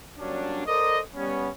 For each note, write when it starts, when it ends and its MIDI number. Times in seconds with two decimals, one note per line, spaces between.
0.19 0.64 54
0.19 0.64 55
0.19 0.64 58
0.19 0.64 61
0.19 0.64 62
0.67 1.00 69
0.67 1.00 70
0.67 1.00 72
0.67 1.00 74
0.67 1.00 75
1.15 1.49 55
1.15 1.49 59
1.15 1.49 61